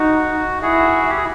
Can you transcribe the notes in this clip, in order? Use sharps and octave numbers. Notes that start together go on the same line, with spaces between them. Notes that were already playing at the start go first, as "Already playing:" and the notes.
Already playing: D#4 F#4
E4 F#4 G#4
G4
G#4